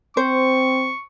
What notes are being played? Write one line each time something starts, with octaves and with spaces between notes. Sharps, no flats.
C4 C5 C#6